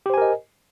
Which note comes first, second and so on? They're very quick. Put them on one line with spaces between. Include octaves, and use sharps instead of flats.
G4 C5 G#5 A#4 D#5